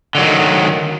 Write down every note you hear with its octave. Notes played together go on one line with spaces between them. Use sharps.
D3 D#3 F#3